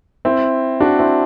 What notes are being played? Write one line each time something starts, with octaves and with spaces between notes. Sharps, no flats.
C4 E4
D4 F#4
C4 E4